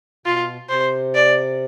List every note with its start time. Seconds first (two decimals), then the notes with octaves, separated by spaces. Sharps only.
0.26 B2 F4
0.69 C3 C5
1.15 D5